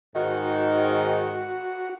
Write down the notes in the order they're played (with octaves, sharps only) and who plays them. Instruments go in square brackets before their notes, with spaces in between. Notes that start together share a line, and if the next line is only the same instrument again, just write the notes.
[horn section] G#2 D#3 [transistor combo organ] F#4